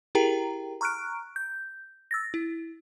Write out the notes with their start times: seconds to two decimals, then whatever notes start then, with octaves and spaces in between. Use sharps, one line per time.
0.15 E4 G4 G#4 A#4 G5 A#5
0.81 A#5 C#6 F6 F#6 D7
1.36 G6
2.11 E6 A6 A#6
2.34 E4